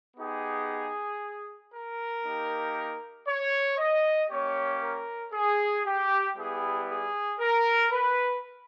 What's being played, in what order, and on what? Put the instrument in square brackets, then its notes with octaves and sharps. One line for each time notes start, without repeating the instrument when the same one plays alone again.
[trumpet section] B3 D#4 G4 G#4
A#4
A#3 D#4 G4
C#5
D#5
A#3 C#4 G4 C#5
A#4
G#4
G4
G3 B3 E4 G4 G#4
G#4
A#4
B4